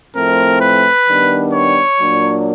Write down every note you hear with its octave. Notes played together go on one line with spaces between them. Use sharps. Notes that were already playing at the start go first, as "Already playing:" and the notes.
A2 F3 A3 C4 A#4
B4
D#3 G3 B3 D4
C#5
A#2 F#3 A#3 D4